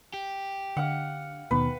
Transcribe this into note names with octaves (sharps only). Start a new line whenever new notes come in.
G4
D3 F5 F#5
D#2 B2 D#3 B4